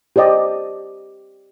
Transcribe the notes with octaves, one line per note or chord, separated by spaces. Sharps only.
G4 C5 D5 D#5 G5